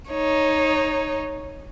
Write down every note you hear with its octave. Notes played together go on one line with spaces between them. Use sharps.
D#4 C#5